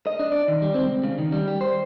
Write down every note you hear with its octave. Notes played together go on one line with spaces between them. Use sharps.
D#5
D4
D5
D#3
G3
C4
C#2
C#3
D#3
G3
G4
C5